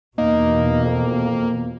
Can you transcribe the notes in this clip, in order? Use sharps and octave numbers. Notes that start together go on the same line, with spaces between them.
E2 B2 A#3 D#4
F2